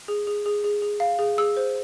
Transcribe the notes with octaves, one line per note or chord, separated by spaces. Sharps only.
G#4
G#4
G#4
G#4
G#4
F5
G#4
G#4 E6
C5